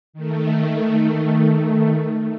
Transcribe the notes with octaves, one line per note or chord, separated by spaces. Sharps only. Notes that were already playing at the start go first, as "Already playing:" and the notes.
D#3 A3